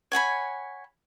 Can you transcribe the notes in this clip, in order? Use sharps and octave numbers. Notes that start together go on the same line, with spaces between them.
C#5 F#5 G#5 B5